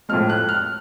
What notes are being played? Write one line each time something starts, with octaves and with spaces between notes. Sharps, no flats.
A2 F3 G#3 F6
F#6
F6